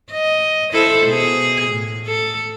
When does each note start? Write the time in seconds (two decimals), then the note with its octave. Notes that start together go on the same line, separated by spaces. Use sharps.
0.12 D#5
0.73 E4 A4 C5
1.07 B2 G#4
1.71 A2
2.07 A4